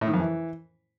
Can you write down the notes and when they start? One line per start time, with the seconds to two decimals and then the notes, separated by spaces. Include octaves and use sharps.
0.01 A2
0.08 D#3
0.14 F2
0.20 E3